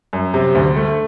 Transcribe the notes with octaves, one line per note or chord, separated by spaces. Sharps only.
F#2
C3
D2
A3